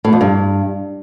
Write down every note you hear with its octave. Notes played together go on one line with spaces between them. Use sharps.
A2
F2
G2